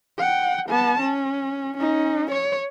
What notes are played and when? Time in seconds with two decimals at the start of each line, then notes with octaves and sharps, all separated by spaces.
0.19 F#5 G5
0.69 B3 A5
1.00 C#4
1.77 C#4 D#4
2.31 C#5